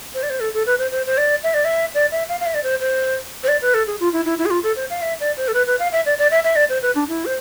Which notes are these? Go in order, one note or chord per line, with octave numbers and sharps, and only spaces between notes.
C5
D5
C5
A4
A4
B4
C5
C5
C5
D5
E5
D5
E5
D5
E5
F5
F5
E5
D5
C5
C5
C5
D5
B4
A4
G#4
F4
E4
E4
E4
G#4
F4
A4
C5
F5
E5
D5
C5
A4
B4
B4
F5
E5
D5
D5
E5
E5
D5
C5
B4
D4
E4
C5